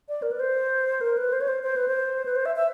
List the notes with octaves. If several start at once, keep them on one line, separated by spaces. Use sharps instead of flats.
D5
A#4
B4
C5
A#4
B4
C5
C#5
C5
C5
B4
C5
B4
C5
E5
E5